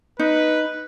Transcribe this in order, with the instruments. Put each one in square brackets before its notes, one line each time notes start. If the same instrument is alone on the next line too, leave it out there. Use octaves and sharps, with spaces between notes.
[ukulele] D#4 [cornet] B4